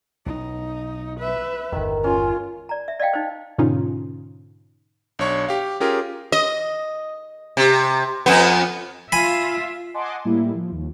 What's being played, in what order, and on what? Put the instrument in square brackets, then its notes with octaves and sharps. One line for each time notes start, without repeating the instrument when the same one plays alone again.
[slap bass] B1 [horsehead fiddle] D#4
[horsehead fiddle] B4 E5
[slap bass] G1 E2 [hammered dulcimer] D#3
[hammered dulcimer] C#4 [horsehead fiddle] F4
[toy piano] D5 A#5
E5
D5 D#5 F5 G5
D#4 C5
[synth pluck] G#2 B2 D3 C#4 D#4 F4
[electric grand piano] B1 D4 C#5 C#6
G4 F5
C#4 F4 G4 G#4 A#4
[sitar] D#5
C3
F2 B3
[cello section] F4 E5 [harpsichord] G#5 B5
[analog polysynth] D#5 F#5 G#5 A5 C6 D6
A2 G3 A#3 E4
F3
D#2